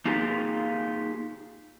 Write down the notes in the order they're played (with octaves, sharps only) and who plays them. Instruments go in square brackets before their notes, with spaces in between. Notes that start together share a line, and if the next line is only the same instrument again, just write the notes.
[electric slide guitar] A#3 D#4 F4 G4 G#4